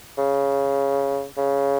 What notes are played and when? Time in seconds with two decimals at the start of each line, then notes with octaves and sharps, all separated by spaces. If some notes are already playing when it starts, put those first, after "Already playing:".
0.18 C#3
1.37 C#3